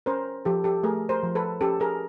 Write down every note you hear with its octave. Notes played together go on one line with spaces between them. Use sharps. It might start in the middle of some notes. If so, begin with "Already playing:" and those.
C#4 A#4 C5
F3 G4 A4
G4 A4
A3 G#4 A#4
A#4 C5
F3
A4 B4
C#4 G4 A4
G#4 A#4